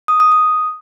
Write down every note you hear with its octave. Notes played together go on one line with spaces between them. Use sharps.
D#6
D#6
D#6